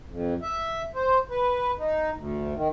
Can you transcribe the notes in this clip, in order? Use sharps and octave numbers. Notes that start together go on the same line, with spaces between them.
F2
E5
C5
B4
D#4
D2
D#3